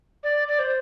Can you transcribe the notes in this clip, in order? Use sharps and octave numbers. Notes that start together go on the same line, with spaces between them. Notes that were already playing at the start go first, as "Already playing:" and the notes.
D5
D5
C5